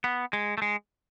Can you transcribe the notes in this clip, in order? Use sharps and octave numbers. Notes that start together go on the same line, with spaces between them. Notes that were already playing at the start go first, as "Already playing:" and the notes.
B3
G#3
A3
G#3